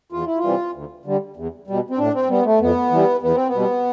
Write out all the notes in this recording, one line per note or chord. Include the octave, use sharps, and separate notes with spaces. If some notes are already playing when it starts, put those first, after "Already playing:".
E2 F4
E4
F4
C3 E3 G3
D2
D3 G3
E2
B2 G3
C4
A2 D4
C4
G3 B3
A3
F2 B3
E3 G3
E2 B3
C4
B3
B2 G3